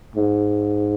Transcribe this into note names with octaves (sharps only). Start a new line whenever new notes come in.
G#2